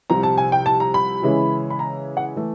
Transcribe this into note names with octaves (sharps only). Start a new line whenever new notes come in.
C2 C3 F3 A#5
A5
G#5
G5
A5
A#5
B5
C#3 E3 G#3 C#4 E4
B5
A#5
F#5
E3 A3